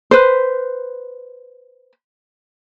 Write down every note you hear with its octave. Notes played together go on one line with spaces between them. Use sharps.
B4 C5